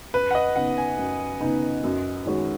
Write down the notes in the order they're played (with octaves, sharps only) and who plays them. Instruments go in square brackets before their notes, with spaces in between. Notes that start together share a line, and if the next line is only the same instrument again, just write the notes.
[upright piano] F#2 [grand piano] B4
[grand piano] F#5
D#5
[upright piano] C#3 B3 D#4 [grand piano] F#5
[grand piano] G#5
[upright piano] F#2
C#3 B3 D#4
F#2
D#3 G#3 C#4 F#4